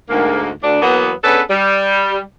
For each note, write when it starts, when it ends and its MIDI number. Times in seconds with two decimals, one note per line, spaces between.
0.10 0.50 38
0.10 0.50 44
0.10 0.50 58
0.62 0.80 38
0.62 0.80 62
0.82 1.11 40
0.82 1.11 54
0.82 1.11 58
0.82 1.11 59
1.24 1.41 59
1.24 1.41 61
1.24 1.41 62
1.24 1.41 68
1.24 1.41 69
1.24 1.41 71
1.50 2.20 55